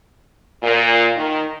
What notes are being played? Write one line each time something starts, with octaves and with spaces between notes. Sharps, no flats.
A#2
D#3